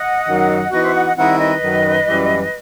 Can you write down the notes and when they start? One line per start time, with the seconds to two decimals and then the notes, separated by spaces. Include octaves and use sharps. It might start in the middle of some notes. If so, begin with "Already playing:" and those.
Already playing: D#5 F#5
0.27 F#2 D#3 F#3
0.71 E3 B3 D#4 F#4 B4 D#5
0.82 C5 E5
0.95 D#5 F#5
1.05 D#5 F#5
1.16 D#3 G3 C4 E4 D#5 F#5
1.39 B4 D#5
1.62 F#2 D#3 F#3
2.06 F#2 E3 G3